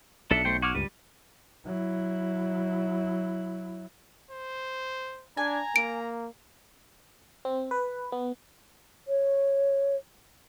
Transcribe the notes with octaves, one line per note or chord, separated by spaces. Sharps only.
B1 D4 A4 E5 C#7
A3 C5 G5
F#4 D6 F6 G#6
C#2 G2 G3 D#7
F#3 E4
C5
D4 G#5 A#5
A#3 D7
C4
B4
B3
C#5